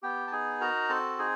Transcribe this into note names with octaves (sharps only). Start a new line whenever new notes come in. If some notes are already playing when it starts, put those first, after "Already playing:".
B3 G4 G5
A5
D#4 G#4 G#5
F#4 A#4 A#5
C4 A4 A5
D#4 G#4 G#5